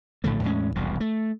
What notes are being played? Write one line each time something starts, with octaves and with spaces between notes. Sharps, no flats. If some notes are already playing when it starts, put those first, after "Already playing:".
A#1 A2 D3 A3
E2 A2 G#3 C#4
E1 C2 F2 B2
A3